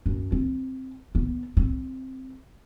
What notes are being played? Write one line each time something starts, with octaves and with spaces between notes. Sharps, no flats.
F#2
C4
B3
C4